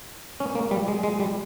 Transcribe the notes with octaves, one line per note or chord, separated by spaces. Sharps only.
C#4
A#3
G3
G#3
G#3
G3